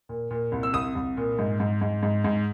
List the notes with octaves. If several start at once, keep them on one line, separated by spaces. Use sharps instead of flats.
A#2
A#2
C2
E6
C2 D#6
C2
A#2
G#2
G#2
G#2
G#2
G#2